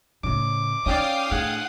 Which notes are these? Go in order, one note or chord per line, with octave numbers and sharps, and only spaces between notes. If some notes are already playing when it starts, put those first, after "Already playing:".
A2 C#3 A3 D6
C#4 D#4 G4 D5 F5 G5 D#6
A2 D4 G#4 F#5